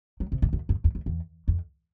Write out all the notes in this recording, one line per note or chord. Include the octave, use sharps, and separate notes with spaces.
F#3
C3
G#2
F#2
F#2
F2
F2
E2
F2